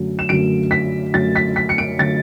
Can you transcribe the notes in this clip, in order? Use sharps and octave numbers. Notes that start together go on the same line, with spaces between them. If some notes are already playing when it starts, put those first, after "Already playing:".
Already playing: F#2 D3 F#3 A3
E7
F#2 D3 F#3 A3 D7
B6
F#2 D3 F#3 A3 A6
B6
B6
C#7
D7
D3 F#3 A3 A6